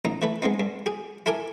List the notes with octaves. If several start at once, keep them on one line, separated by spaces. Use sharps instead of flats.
A1 D#4 A#5
E3 A3 B4
G#3 B3 C4 D#4
G2
G4 G#4
E4 A4 A#4 G#5 D6